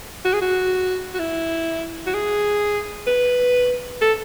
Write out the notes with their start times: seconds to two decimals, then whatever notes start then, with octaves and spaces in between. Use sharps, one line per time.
0.25 F#4
0.33 G#4
0.42 F#4
1.14 F#4
1.19 E4
2.06 F#4
2.14 G#4
3.07 B4
4.01 A4